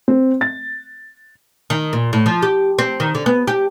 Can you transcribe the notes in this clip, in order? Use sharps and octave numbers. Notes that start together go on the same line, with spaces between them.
C4
A6
D#3
A#2
A2
F3
G4
C4
D#3
D3
B3
G4